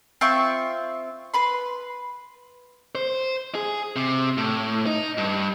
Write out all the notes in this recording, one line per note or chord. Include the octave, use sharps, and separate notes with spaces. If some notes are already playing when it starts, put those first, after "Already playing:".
C4 F4 E5 C#6
B4 B5 C6
C5
G#4
C3
A2
D#4
G2